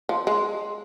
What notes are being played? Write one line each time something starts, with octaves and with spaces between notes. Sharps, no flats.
F3
G#3